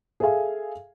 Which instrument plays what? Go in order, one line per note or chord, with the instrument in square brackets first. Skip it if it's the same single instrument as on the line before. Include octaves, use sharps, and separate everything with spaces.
[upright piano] G#4 A4 E5 F5 G#5